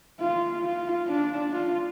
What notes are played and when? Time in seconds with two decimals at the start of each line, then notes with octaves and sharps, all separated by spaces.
0.20 F4
0.64 F4
1.08 D4
1.52 F4